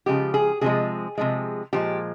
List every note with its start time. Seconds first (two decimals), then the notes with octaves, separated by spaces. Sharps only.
0.06 C#3 F3 G#3 G4
0.34 G#4
0.61 C3 F3 G#3 G#4
1.18 C3 F3 G#3
1.73 A#2 F3 G#3 G4